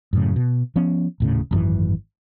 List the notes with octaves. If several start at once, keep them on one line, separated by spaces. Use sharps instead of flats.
F#2 A2 C#3
B2
F3 B3 C#4
D#1 A2 C#3
G#1 F#2 E3